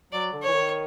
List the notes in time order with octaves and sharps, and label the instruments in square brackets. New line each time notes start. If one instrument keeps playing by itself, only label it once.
[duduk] F#3 [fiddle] D5
[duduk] D3
[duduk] E3 [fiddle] C#5
[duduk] D#3